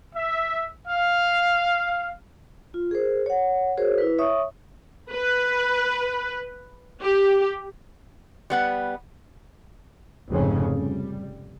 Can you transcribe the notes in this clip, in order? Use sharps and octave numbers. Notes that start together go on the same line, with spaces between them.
E5
F5
F4
G#4 A#4 C5
C#5 F#5
F#4 G#4 A#4 C5 C#5
E4 B4
C#5 E5 C#6 D#6
B4
G4
G3 B3 F#5
F1 F2 G#2 C#3 C#4
G3